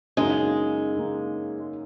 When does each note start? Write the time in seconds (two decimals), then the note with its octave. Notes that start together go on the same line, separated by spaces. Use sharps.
0.17 F#2 C#3 G#3 A#3 D#4
0.97 C#3 A#3 D#4